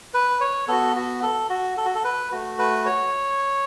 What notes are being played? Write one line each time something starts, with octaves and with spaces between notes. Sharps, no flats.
B4
C#5
B3 F#4 A4
F#4
A4
F#4
A4
F#4
A4
B4
A3 F#4
B4
C#5